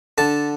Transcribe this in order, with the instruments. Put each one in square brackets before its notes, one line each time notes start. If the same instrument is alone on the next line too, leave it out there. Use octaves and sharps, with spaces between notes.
[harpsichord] D3 A5